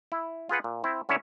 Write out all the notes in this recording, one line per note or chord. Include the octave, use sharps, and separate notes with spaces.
E4
F4 G#4 B4 F#5
A#2
C4 E4
D3 C#4 E4 C#5 E5